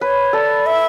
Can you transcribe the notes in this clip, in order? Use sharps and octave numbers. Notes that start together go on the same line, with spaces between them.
B4 C#5
A4 D5
E5